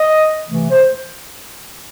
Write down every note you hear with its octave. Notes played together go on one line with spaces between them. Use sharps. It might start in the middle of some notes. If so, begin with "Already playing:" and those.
Already playing: D#5
C3 E3 A3
C5